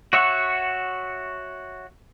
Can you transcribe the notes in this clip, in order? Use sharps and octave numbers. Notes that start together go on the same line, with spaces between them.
F#4 C#5 E5 F#5 C#6